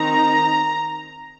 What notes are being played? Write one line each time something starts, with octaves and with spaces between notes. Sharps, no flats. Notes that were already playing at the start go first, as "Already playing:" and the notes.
Already playing: D#3 C4 D#4 A#5